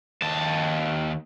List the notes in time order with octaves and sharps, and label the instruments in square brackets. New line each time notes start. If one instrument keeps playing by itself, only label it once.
[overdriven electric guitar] D#2 A5